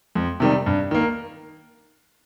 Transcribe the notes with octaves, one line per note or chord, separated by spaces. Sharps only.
F2
C3 D#3 G3
G2
D#3 A#3